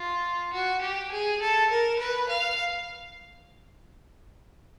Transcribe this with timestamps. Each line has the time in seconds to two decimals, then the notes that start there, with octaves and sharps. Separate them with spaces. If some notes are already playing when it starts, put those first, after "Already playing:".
Already playing: F4
0.53 F#4
0.81 G4
1.12 G#4
1.41 A4
1.70 A#4
1.99 B4
2.29 F5